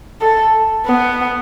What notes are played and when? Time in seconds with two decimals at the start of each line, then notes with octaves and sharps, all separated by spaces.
0.21 A4
0.86 B3